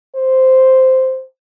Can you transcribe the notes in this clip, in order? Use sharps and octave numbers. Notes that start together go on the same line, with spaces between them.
C5